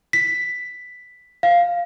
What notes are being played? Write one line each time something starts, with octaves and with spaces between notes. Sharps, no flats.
B6
F5